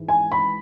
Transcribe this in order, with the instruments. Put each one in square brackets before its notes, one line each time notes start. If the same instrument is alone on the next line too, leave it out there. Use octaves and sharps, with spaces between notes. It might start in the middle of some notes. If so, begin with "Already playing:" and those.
Already playing: [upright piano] G#2 E3
G#5
B5